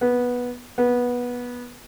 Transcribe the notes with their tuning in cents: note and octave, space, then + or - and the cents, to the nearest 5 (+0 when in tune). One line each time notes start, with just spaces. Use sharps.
B3 -10
B3 -15